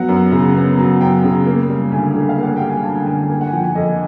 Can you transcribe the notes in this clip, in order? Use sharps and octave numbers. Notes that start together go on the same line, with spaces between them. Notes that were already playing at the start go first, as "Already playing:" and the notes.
Already playing: F#3 B3 F#5
F#2
C#3
B3
F#3
F#2 G5
C#3
A#3
G3
D2 G#5
D3
F5
A#3 F#5
G3 G5
G#5
D2 A5
G5
D3 G#5
A#3 G5
F#5
G#5
F3 G5
G#5
F2 D#5